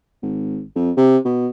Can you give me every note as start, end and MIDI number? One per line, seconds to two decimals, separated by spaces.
0.23 0.62 32
0.76 0.92 41
0.97 1.18 48
1.25 1.49 47